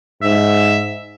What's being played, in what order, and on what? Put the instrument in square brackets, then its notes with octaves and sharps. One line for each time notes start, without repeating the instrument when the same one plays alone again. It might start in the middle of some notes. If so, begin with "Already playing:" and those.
[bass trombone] G#2 [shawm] E5